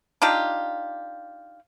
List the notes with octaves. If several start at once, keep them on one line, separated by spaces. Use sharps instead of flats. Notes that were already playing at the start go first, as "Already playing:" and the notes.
D4 D#4 F4 G4